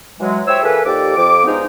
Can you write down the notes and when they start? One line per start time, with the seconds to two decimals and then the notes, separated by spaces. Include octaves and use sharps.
0.20 E3 F#3 G#3
0.47 E4 G4 C5 C#5 E6
0.63 E3 A#3 G#4 A4 B4
0.85 D#2 F3 G4 A4 D5 D6
1.16 F2 D6
1.45 G2 F3 G#3 B3 D#4